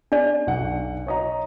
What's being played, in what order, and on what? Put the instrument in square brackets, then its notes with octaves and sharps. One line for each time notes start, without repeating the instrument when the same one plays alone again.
[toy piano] D4 D5
[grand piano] B1 F#5
C#5 D#5 A#5